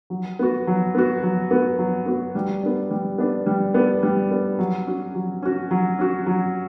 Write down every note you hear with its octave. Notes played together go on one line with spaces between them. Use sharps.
F#3
B3 F#4
F#3
B3 F#4
F#3
B3 F#4
F#3
B3 F#4
G3
B3 D4
G3
B3 D4
G3
B3 D4
G3
B3 D4
F#3
C#4 F#4
F#3
C#4 F#4
F#3
C#4 F#4
F#3